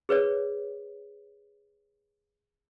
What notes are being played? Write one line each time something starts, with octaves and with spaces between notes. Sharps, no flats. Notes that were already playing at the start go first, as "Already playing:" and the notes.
G#4 B4 C#5 D5